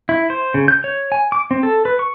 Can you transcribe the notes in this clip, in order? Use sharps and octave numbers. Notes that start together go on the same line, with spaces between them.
E4
C5
C#3
G6
C#5
G#5
D6
C4
A4
B4
C#6